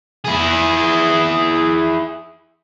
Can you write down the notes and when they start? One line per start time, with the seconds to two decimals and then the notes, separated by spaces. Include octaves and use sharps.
0.25 E4 G#4